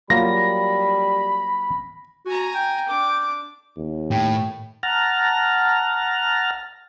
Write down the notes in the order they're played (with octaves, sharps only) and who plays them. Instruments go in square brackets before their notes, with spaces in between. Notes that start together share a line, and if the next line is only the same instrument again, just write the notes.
[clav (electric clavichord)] F#3 A#3 F4 [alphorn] G3 [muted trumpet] B5 [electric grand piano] A#6
[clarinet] F#4 [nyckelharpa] G#5 A#5
[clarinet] G5
[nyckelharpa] D4 D6
[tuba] D#2
[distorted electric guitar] A2 [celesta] G5
[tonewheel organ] F#5 A5 A#5 F6